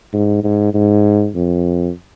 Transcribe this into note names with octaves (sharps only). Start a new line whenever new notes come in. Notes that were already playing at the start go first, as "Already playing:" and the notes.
G#2
G#2
G#2
F2